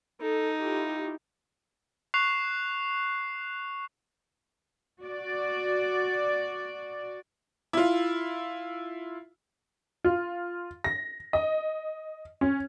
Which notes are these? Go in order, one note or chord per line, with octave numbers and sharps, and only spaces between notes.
D#4 A4
E4 F4 G4
C#6 F#6 C7 F7
F#4 D5
E4 F4
F4
A#6
D#5
C#4